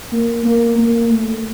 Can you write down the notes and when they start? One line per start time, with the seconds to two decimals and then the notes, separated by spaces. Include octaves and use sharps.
0.12 A#3
0.45 A#3
0.78 A#3
1.11 A3